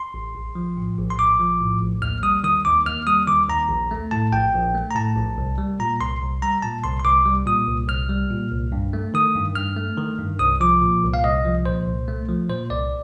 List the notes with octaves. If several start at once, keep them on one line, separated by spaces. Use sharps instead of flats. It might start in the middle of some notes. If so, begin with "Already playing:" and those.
Already playing: C6
A1
A#1
F3
A2
A#1
C6
A#1 D6
F3
A2
A#1
D#2 F6
G3 D#6
D#3 D#6
D#2 D6
D#2 F6
G3 D#6
D#3 D6
D#2 A#5
A#1
A3
A2 A5
A#1 G5
A#1
A3
A#5
A2 A5
A#1
C2
G3
A#2 A#5
C2 C6
C2
G3 A#5
A#2 A5
C2 C6
C6
C2 D6
G3
A#2 D#6
C2
C2 F6
G3
A#2
C2
G2
A3
D#3 D#6
G2
G2 F6
A3
D#3
G2
C2 D#6
F3 D6
A#2
C2
F5
C2 D#5
F3
A#2 C5
C2
A3
F3
A#2 C5
C2 D5